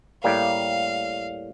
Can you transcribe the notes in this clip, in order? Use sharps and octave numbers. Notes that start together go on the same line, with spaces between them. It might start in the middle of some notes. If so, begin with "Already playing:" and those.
A2 G3 A#3 F5